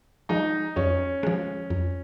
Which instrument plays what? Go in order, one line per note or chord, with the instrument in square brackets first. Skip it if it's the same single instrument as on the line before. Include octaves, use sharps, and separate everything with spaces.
[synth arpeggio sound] F3 G#3 [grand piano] D#4
[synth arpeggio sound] F2 [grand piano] C#4
[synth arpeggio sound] F3 G#3
F2